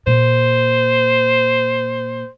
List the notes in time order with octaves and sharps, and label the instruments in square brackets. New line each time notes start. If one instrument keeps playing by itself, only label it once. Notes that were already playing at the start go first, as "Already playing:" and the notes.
[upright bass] A#2 [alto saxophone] C5